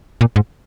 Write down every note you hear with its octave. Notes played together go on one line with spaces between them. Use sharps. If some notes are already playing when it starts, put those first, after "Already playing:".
A#2
G#2